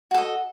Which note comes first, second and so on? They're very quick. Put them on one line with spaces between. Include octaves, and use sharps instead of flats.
F#4 A4 D#5